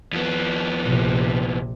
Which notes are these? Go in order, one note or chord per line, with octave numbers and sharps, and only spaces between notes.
F2 B3
A#1 C3